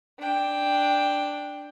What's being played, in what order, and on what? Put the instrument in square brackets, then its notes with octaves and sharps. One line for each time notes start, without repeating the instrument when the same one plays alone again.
[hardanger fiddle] D4 G5